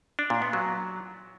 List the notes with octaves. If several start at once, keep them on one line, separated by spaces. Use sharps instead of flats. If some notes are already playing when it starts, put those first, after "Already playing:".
D4
A#2
B3
F#3